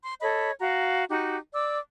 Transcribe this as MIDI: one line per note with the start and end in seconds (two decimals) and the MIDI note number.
0.04 0.16 84
0.21 0.51 69
0.21 0.51 73
0.21 0.51 75
0.21 0.51 83
0.60 1.04 66
0.60 1.04 77
0.60 1.04 82
1.10 1.36 63
1.10 1.36 66
1.10 1.36 67
1.53 1.79 74
1.53 1.79 86
1.53 1.79 88